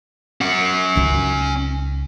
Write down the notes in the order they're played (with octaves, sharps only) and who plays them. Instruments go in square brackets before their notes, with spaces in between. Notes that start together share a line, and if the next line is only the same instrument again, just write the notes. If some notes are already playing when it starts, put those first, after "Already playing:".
[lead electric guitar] C#4 F#5
[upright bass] C#2 D#4